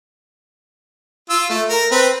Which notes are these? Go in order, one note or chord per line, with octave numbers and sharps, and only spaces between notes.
F4 E6
A3
A#4
C4 B4